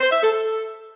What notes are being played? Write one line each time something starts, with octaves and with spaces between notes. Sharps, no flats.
C5
E5
A4
A4